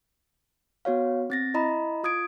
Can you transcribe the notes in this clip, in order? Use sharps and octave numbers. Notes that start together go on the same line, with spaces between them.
B3 F#4 C#5 F5
C4 A6 A#6
E4 D#5 A#5 B5
F4 D#6 G#6 D7